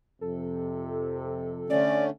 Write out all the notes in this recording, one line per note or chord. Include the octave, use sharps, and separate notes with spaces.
F2 C3 A4
D3 A3 C#4 D5